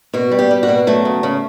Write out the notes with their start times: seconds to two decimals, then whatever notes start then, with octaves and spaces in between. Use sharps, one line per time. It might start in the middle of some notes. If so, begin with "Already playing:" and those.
0.13 B2 F#4
0.31 G3
0.39 G4
0.51 G3
0.63 F#4
0.68 B2
0.87 F#3 A3
1.05 C#3
1.23 C#3